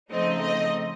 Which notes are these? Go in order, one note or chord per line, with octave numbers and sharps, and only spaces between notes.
C#3 F3 A3 C4 D#4 D#5
D#5